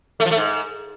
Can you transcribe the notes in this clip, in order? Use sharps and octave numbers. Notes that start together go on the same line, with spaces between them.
A3
F3
A3
G#2